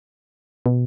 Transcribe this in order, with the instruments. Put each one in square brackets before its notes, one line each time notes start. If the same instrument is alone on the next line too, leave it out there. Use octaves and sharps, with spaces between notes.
[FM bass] B2